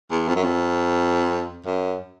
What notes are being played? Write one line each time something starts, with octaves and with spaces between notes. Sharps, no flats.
E2
F2
F#2
F2
F#2